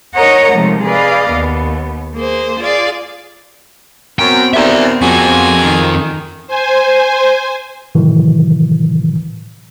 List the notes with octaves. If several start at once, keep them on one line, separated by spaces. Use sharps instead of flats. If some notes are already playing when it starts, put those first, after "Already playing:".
D#4 A#4 C#5 D#5 F#5 A#5
C3 D#3 F3 G#3 A3
G#4 B4 D5 D#5 F5
D#2 B3
A#3 G#4 C5
F4 G#4 D5 F5
F#2 B3 C4 G5
D#2 A#2 D5 E5
F2 A#2 F4 F#4 G#4
D#3
C5 G#5
A2 C3 D#3 E3 F#3